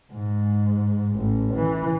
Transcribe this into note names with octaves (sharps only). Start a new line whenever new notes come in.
G#2
A1
E3